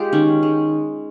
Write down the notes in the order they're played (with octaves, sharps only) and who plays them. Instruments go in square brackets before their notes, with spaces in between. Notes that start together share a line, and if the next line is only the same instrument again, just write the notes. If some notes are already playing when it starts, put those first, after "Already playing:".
Already playing: [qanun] G#3 F4 G4
D#3 C#4
G#3